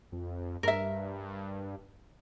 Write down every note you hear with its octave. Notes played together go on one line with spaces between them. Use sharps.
F2
G2 A#4 E5